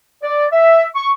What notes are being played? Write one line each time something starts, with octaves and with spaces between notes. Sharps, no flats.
D5
E5
C#6